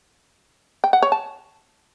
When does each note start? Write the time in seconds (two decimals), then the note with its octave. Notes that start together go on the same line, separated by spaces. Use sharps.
0.84 G5
0.93 F#5
1.02 C#5
1.12 A5